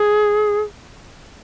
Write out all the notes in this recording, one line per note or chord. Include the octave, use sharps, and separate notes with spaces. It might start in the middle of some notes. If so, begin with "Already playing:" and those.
Already playing: G#4